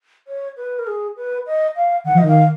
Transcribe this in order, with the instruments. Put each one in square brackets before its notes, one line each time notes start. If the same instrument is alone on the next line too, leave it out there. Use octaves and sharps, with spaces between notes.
[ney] C#5
B4
A#4
G#4
B4
D#5
F5
[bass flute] D#3 [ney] F#5
[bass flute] F3
[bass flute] D#3 [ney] D#5
[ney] F5